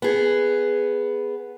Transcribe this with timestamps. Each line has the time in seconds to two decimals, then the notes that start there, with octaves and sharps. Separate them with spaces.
0.02 B3 G#4